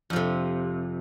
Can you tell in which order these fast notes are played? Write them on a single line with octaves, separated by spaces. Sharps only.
F2 F3 C3